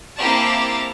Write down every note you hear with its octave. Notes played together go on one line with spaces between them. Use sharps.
A#3 C4 E4 G4 A5 A#5